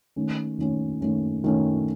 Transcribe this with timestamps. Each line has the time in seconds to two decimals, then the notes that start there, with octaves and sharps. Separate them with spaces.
0.16 D#3 A3 C#4
0.58 D#3 A3 C#4
1.01 D#3 A3 C#4
1.44 D#3 A3 C#4